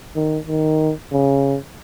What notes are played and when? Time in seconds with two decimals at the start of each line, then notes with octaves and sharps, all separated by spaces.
0.16 D#3
0.47 D#3
1.12 C#3